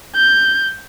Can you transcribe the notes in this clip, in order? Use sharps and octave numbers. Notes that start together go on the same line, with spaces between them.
G6